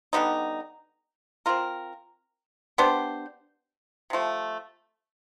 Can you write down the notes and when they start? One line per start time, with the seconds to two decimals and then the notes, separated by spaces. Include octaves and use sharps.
0.13 D3 G3 B3 D#4
1.46 C4 F4 A#4
2.78 B3 D4 G4 C5
4.10 C3 F3 A3